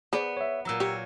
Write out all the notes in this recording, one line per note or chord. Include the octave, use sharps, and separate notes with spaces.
B3 G#4 C5 D5
C#5 E5
A#2 F#3 A#5 E6
G4 C#5